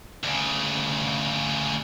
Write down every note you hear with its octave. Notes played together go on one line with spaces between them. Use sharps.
D2 C#3